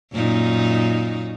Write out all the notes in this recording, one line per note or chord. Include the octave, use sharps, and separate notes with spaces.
F#2 A#2 D#4